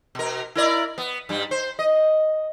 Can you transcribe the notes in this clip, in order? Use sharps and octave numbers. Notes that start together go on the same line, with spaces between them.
B2 A#4
E4 A#4 D5
B3
G2 G3
C5
D#5